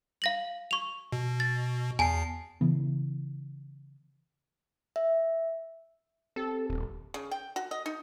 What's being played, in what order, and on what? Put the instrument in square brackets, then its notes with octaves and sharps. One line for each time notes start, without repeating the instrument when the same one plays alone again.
[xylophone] F5 A#6 F#7
C#6 F7
[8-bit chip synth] B2
[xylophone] A6
[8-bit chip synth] E2 C7 [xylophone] G#5 A5
[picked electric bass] C#3 E3 B3
[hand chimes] E5
[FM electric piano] C4 G4 [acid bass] A4
[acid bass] D#1
[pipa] C#3
G5
F#4
D#5
D#4